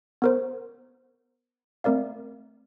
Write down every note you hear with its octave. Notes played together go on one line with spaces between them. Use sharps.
B3 A#4 C5
A3 C4 A#4 D5 F5